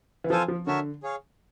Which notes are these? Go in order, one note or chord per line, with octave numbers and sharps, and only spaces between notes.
E3
F3 F4 A4 C5 F5 G#5
F3
D3 F#4 A#4 C#5 E5 A5
G#4 C#5 F5